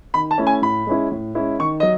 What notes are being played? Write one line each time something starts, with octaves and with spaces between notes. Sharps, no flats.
D#3 B5
A5
A3 C#4 E4
G#5
A2 B5
G#3 C#4 E4
A2
G#3 C#4 E4
D#3 C#6
F#3 D#5